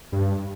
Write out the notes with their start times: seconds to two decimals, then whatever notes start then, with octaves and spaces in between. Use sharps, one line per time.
0.12 G2